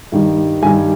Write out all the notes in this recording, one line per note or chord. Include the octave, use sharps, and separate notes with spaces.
G2 D#3 G3
G2 D#3 G3 G#5